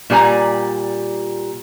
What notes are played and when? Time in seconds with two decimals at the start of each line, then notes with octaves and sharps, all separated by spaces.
0.10 A#2 G3 D5 G#5 A#5